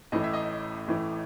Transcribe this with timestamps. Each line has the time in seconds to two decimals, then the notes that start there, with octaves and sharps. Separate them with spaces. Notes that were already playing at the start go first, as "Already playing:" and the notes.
0.12 A1 A2 E3 D#5
0.24 E5
0.33 D#5
0.88 A1 A2 E3